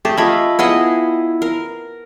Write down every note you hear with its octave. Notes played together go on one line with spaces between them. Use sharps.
A3 G4 G#4 A5
A3 F4 D#5 B5 G#6
B3 E4 G#4 D#5
A#4